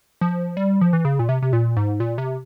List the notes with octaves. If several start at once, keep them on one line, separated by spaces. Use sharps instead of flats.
F3
G3
F3
E3
C#3
A#2
C3
C3
A#2
G#2
A#2
C3